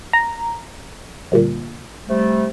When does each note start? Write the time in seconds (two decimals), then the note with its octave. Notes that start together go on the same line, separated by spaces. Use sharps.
0.13 A#5
1.32 D2 G2 A#2
2.07 C3 G3 A3